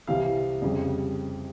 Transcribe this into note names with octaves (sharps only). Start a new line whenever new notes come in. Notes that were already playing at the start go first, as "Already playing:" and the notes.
C2 C3 E3 F5
F2 C#3 G3